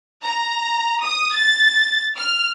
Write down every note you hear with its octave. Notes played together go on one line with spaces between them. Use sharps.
A#5
D#6
A6
F6